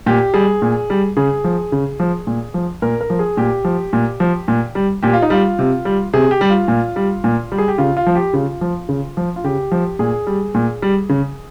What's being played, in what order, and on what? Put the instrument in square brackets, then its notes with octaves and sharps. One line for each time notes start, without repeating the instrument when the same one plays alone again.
[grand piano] A#2 G4
G3 G#4
A#2
G3
C#3 G#4
F3
C#3
F3
A#2
F3
A#2 A#4
A#4
F3
G#4
A#2 G4
F3
A#2
F3
A#2
G3
A#2 G4
F4
D#4
G3 F4
C3
G3
C3 G#4
G4
G3
F4
A#2
G3
A#2
G3
G#4
G4
C#3 F4
F4
F3
G4
C#3 F4
F3
C#3
F3
F4
C#3 G4
F3
A#2 G#4
G3
A#2
G3
C#3